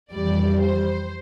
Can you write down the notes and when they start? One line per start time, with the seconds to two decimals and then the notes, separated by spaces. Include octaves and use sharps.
0.13 F2 E3 G3 D5
0.61 C5